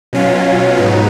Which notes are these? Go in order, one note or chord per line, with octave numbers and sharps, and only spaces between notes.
B2 F#3 C#4 F4
G#2 F#3 B3 D#4